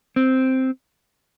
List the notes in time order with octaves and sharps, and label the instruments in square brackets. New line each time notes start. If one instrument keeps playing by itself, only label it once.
[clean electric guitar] C4